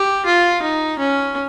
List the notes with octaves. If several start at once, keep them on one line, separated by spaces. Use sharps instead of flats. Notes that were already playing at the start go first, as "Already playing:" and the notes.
Already playing: G4
F4
D#4
C#4